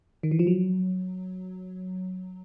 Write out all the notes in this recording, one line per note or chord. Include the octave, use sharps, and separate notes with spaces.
D#3
E3
F3
F#3